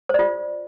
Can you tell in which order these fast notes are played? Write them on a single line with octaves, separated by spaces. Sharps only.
C5 D5 F4